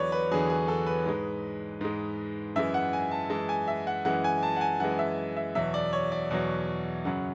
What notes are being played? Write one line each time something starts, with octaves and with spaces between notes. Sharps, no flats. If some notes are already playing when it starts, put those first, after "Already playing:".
Already playing: E2 D3 F#3 B4 C#5 D5
B4
E2 D3 F#3 G#4
G#4
A4
B4
G#2 G#3
G#2 G#3
F#2 E3 G#3 E5
F#5
G#5
A5
F#2 E3 G#3 A5
G#5
E5
F#5
F#2 E3 G#3 F#5
G#5
A5
F#5
G#5
F#2 E3 G#3 F#5
E5
E5
E2 B2 F#3 E5
D5
C#5
D5
E2 B2 F#3
F#2 C#3 F#3 F#5